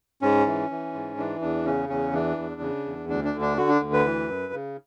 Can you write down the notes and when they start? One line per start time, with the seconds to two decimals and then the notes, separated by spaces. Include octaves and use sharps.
0.22 G#2 C#4
0.46 E3
0.71 E3
0.93 G#2
1.18 E3 D4
1.41 E2 D4
1.65 C#3 C#4
1.89 E2 C#4
2.13 E3 D4
2.37 E2
2.61 C#3
2.85 E2
3.09 D2 D4
3.24 D4
3.33 D3
3.41 D4
3.57 D3 F#4
3.69 D4
3.81 D2
3.93 B4
4.05 E3
4.28 F#2
4.53 C#3